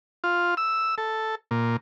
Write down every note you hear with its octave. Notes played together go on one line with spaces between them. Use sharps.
F4
E6
A4
A#2